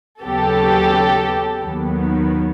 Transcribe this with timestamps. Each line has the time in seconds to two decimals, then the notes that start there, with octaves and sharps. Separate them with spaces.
0.22 D#2 C#3 F#3 B3 G4 A4
1.62 D#2 D#3 F#3 B3